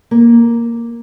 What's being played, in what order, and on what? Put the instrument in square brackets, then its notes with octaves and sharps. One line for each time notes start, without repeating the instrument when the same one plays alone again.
[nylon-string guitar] A#3